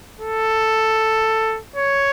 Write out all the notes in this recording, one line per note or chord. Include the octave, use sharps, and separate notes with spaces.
A4
C#5